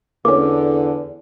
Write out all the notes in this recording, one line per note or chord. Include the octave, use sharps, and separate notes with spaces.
E2 D3 A#3 C#4 D6